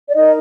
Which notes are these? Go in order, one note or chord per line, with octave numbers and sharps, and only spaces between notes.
D5
D#4 A#4 D#5